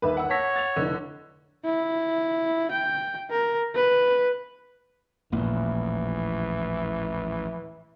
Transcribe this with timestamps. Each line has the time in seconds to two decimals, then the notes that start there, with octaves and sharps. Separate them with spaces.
0.02 G1 D#2 B4 E5
0.17 F#5 E6
0.30 C#5 A5 A#6 B6
0.56 A6 F7
0.76 F1 D3 E4
1.64 E4
2.71 G5
3.30 A#4
3.75 B4
5.32 A1 D#2 A#2 E3 F3 G#3